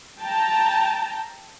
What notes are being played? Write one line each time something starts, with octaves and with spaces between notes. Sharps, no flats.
G5 A5 A#5